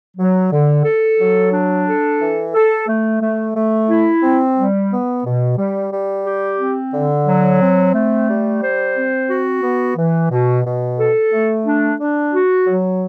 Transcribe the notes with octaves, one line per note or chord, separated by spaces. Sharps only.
F#3
D3
A4
F#3
D4
A4
E3
A4
A3
A3
A3
E4
C4
G3
B3
B2
G3
G3
G4
C4
D3
F#3
C4
A3
G3
C5
C4
F#4
B3
E3
B2
B2
A4
A3
D4
D4
F#4
F#3